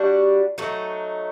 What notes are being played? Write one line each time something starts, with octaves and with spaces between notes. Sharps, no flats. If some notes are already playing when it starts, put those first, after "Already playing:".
Already playing: G3 D4 F#4
F#3 A3 D#4